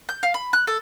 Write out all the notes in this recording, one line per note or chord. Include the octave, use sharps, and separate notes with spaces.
G6
F5
B5
F#6
A4